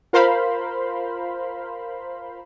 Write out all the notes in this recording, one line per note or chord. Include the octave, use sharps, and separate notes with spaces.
F4 A#4 C5 F5 B5 C6